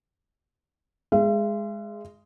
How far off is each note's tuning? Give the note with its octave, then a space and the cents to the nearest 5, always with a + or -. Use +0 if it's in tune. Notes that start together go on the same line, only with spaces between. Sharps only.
G#3 +0 E5 +45